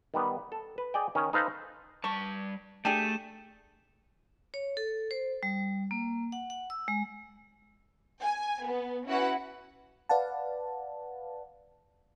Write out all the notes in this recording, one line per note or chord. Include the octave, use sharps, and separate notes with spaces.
D#3 G3 B3
A4
B4
G#4 D5 D#5 G5
D#3 C#4
D#4 A4 B4 C5 F5
G3 A5 C#6
A3 D4 G4 G#4 G6 D#7 E7
C#5
A4
C5
G3
A#3
F#5
F#5
E6
G#3
G#5
B3
C#4 E4 F#4 B4 F#5
B4 D5 F5 F#5 A5